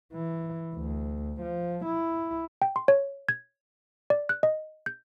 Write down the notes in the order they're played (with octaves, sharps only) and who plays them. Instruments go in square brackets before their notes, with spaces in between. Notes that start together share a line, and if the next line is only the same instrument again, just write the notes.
[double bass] E3
D2
F3
E4
[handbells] G5
C6
C#5
G#6
D5
F#6
D#5
G6